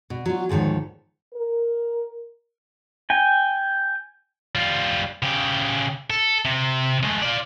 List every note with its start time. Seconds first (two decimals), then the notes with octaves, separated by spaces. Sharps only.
0.10 B2
0.26 F#3 F4
0.49 D2 G#2 D#3 F3 C#5
1.34 A#4
3.10 G5 G#5
4.55 G3 F4
5.23 C#3 G4
6.10 A4
6.45 C3
7.03 G#3 A3
7.22 F4 D5